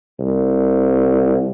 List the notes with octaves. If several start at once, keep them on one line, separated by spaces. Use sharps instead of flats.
C2